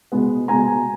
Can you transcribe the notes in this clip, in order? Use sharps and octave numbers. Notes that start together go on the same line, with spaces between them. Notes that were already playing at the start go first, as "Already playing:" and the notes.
B2 G#3 B3
B2 G#3 B3 G#5 A#5